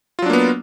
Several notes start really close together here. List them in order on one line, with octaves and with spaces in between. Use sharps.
F4 F#3 D4 A#3 B3